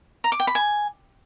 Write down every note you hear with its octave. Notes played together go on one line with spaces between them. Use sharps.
A#5
D6
G5
B5
G#5